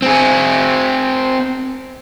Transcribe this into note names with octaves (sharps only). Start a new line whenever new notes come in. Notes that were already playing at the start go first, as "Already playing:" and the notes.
C4 G#4